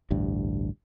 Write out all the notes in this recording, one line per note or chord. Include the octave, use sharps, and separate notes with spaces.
A1 D2 G2